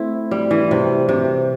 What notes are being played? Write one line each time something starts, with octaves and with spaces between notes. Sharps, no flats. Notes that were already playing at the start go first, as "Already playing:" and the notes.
Already playing: A3 C4 E4
G3
E3
C3
C3